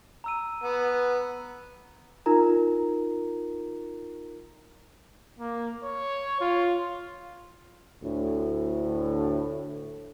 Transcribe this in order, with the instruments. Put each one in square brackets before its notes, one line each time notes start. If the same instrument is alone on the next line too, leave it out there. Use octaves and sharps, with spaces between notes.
[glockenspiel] A#5 E6 D#7
[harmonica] B3
[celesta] D#4 F4 A#4 A#5
[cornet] A#3
C#5
F4
[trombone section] D2 A2